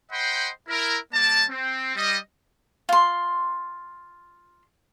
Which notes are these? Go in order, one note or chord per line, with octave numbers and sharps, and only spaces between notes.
C5 D#5 F#5 G5 B5 C6
E4 A#4
G3 A#3 D5 A5
C4
G3 D#5
F4 C6